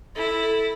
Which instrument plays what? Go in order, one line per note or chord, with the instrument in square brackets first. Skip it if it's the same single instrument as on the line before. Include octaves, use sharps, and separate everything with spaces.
[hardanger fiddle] E4 [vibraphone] A4
[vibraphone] A4